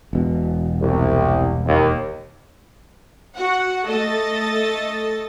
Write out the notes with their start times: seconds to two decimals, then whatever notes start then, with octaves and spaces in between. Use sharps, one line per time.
0.13 E1 B2
0.79 C2
1.65 D#2
3.36 F#4 F#5
3.87 A3 A4 D#5 A6